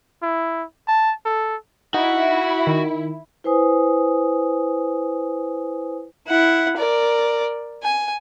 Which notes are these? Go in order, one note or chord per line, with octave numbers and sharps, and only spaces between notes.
E4
A5
A4
D#4 E4 F#4
D#3
E4 B4 C5 G#5 D#6
E4 F#5
A#4 D5
G#5